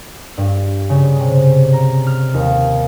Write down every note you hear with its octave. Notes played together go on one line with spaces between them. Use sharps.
G2
C#3
C3
A#5
F6
D#2